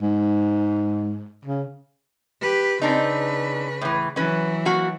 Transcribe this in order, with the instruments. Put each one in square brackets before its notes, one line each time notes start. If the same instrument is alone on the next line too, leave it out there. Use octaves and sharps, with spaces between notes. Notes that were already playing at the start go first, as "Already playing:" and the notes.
[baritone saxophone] G#2
C#3
[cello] G4 B4
[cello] C#3 B4 [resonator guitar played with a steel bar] C4 D4 D#4
[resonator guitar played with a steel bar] A2 E3
[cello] E3 F#3 [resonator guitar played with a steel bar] C#4 B4
[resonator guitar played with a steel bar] A#3 F#4